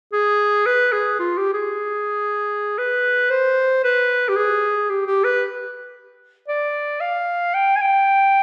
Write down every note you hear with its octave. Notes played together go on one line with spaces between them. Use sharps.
G#4
B4
G#4
F4
G4
G#4
B4
C5
B4
G4
G#4
G4
G4
B4
D5
F5
G5
G#5
G5